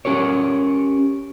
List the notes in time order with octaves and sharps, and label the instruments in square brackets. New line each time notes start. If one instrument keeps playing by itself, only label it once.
[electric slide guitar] C#4 G4 A#4 C#5